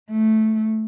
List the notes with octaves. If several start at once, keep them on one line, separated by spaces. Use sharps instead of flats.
A3